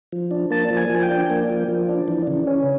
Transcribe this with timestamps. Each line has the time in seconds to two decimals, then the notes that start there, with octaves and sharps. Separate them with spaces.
0.12 F3
0.31 D4
0.50 A#3 A5
0.71 F3
0.77 G#5
0.90 F3
1.03 G5
1.10 D4
1.30 A#3
1.50 F3
1.68 F3
1.89 D4
2.08 E3
2.27 C#3
2.47 C#4